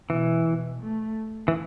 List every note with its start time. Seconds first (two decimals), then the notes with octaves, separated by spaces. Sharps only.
0.09 B2 E3
0.46 B2
0.82 A3
1.48 E3